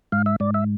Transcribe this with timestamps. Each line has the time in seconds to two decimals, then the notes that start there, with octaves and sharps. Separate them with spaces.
0.12 G#2 F5
0.26 E5
0.40 G#2 D5
0.54 E5